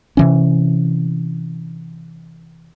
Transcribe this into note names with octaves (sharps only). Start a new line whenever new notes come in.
C3 E3 C#4